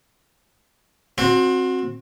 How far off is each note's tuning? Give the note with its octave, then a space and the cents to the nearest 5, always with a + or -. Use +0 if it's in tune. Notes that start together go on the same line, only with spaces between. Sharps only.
C4 +20 F#4 -20